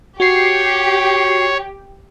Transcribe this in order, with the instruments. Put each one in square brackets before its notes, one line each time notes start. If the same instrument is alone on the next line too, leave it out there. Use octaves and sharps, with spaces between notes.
[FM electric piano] F#4 C7 [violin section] G4 [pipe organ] C#5